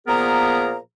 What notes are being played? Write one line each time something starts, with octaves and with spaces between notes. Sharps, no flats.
A#2 F3 B3 G#4 A#4 A#5